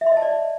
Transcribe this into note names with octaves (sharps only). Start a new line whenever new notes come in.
E5
C6
D#5
A5
D5